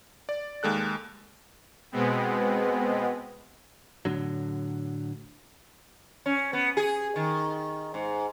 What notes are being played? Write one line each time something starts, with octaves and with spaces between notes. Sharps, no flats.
D5
D#2 G#3 A4 F#6
B2 G#3 B3 C4
A2 D3 F#3
C#4
B3
G#4
D#3
G#2